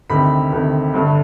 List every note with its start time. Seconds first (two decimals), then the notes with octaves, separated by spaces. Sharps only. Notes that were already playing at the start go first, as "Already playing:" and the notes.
0.10 D2 C3 D#3 B5
0.52 D2 C3 D#3
0.94 G1 G2 D3